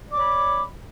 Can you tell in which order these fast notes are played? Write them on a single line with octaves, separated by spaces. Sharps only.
D5 D6 C#5 B5